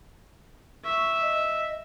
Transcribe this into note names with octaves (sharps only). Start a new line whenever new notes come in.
E5 C#6
D#5